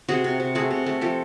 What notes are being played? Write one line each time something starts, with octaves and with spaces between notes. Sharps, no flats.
C3 F#4 G#4
C3
C3
A3 F#4 G#4
C3
A3
F3 G4 A4